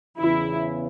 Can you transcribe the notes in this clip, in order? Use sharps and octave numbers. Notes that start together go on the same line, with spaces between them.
E2 C#3 E3 E4